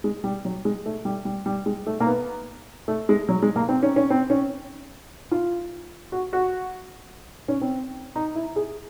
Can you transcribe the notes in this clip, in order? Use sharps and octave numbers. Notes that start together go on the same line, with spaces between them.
G#3
G3
F#3
G#3
A3
G3
G3
G3
G#3
A3
A#3
B3
A3
G#3
F#3
G#3
A#3
C4
C#4
C#4
C4
C#4
F4
F#4
F#4
C#4
C4
D#4
E4
G#4